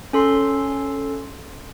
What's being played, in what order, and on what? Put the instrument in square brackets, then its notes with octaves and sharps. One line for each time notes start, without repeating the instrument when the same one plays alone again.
[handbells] C#4 A4 C6 C7